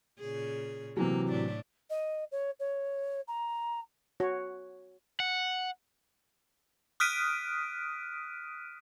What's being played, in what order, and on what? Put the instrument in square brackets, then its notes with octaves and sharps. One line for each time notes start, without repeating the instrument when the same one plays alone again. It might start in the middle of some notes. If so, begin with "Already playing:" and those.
[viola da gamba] A#2 C#3 G#4
[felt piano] C3 E3 F#3 [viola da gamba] A#3
[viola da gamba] A2 D4
[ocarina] D#5
C#5
C#5
A#5
[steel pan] F#4 C#5
[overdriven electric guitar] F#5
[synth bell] D#6 F6 F#6 B6 D7 D#7